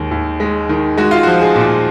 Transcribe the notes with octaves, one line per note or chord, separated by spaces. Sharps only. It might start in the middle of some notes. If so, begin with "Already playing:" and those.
Already playing: D#2 D#3 G#3
D#2
G#3
D#3
G#3 F#4
F4
F3 F#4
G#4
A#2